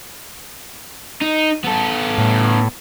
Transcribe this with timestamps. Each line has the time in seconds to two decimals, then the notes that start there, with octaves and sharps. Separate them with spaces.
1.22 D#4
1.64 B3 A4
2.18 A2